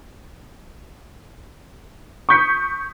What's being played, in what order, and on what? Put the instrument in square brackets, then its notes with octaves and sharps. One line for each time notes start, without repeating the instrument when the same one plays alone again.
[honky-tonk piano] C#6 D#6 G6 B6 C#7